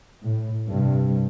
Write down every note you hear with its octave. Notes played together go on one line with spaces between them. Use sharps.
A2
G2 C3